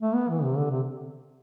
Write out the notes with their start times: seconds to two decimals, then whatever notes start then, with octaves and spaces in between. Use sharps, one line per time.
0.01 A3
0.15 B3
0.29 E3
0.43 C3
0.57 D3
0.71 C3